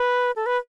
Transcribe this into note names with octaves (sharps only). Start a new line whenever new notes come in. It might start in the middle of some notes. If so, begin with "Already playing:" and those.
Already playing: B4
A4
B4